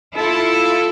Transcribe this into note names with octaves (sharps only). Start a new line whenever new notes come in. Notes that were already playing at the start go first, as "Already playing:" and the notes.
E4 F4 A4